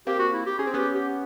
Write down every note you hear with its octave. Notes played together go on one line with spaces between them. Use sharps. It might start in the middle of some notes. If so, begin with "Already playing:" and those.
A#3 C4 G4
F#4
E4
G4
C#4 G#4
C4
B3 C#4 G4
G4